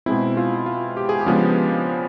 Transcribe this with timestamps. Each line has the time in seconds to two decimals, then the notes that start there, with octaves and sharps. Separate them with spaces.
0.06 B2 G#3 C4 E4
0.37 F4
0.66 F4
0.97 G4
1.09 G#4
1.21 G4
1.26 C#3 F3 G#3 B3 D4